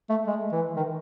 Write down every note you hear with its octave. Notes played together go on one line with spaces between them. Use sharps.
A3
G#3
E3
D#3